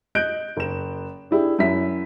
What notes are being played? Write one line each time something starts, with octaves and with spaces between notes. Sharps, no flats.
D#5 F#6 G6 D7
F#1 E7
D4 E4 G4 G#4
F#2 E4 E5 B6